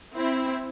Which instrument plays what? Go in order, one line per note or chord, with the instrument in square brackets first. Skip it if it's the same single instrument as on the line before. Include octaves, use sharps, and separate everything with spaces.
[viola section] C4 E4